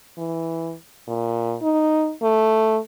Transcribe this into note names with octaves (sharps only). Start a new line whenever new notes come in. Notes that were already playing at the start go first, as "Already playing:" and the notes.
E3
A#2
D#4
A3